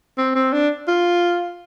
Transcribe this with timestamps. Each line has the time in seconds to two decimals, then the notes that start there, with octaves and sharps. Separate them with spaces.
0.18 C4
0.35 C4
0.53 D4
0.88 F4